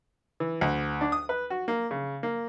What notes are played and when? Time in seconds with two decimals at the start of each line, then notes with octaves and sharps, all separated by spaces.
0.40 E3
0.61 D2
1.01 D4
1.12 D#6
1.29 B4
1.50 F#4
1.68 A#3
1.91 C#3
2.23 A#3